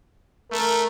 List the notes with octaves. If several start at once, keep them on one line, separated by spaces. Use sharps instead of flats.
A3 A#4